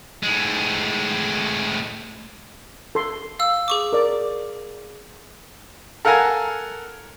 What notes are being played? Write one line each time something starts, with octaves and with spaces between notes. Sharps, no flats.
A2 G#3
A4 C6
F5 E6
G#4 C#6 D6
A#4 D5
A4 A#4 F5 F#5 G#5 A#5